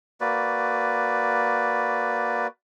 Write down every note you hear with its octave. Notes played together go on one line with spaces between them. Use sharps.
A#3 F#4 B4 D5